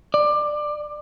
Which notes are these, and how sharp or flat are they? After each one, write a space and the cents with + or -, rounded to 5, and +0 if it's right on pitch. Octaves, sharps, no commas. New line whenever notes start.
D5 +20